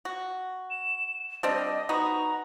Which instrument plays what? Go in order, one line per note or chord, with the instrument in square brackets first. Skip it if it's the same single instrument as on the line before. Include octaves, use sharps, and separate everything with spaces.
[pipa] F#4
[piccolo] E7
[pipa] G3 C4 D4 [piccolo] D#5
[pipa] B3 D#4 F#4 [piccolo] A#5